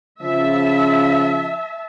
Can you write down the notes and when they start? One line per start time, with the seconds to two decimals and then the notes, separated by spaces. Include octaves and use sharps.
0.22 C#3 F3 E5 A5